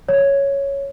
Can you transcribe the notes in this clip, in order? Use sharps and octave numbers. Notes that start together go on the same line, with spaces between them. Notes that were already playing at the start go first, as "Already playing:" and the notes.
C#5